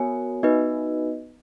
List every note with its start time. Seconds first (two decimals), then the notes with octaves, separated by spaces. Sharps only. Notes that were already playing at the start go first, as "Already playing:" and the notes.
Already playing: B3 F#4 A#4 C#5 G#5
0.43 B3 D#4 F#4 B4 D#5